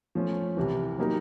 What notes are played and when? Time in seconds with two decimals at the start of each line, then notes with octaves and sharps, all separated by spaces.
0.15 F3 A3 C#4
0.57 C2 C3 E3
0.98 F#3 A#3 D#4 G4 A#4